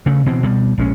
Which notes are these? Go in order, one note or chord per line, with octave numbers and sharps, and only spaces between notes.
C#3 A3
B2 E3 C4
B2 G3
A#1 G#3 C#4